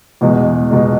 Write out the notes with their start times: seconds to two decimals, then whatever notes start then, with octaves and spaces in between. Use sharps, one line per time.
0.21 E2 B2 G#3
0.71 B2 G#3